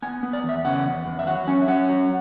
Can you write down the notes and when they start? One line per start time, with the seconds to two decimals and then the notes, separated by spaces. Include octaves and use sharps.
0.02 B3 G#5
0.23 B3
0.33 D5
0.44 E2 E5
0.65 C#3 F#5
0.85 E2
1.07 E2
1.19 E5
1.27 F#3 F#5
1.47 C#4 G#5
1.62 E5
1.68 C#4 F#5
1.89 F#3